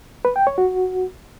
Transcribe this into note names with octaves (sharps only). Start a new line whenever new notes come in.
B4
G5
C#5
F#4